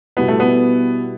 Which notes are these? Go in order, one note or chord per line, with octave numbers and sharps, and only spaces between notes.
B2 G3 B3 E4
A3
B3